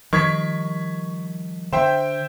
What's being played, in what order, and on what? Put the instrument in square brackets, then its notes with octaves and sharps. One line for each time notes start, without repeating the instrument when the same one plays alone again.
[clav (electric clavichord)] D#3 [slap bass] F3 G3 [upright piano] C#6 G#6 B6
[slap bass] D3 [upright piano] C5 E5 G5